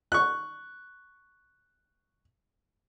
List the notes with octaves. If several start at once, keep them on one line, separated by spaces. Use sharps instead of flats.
C#6 F#6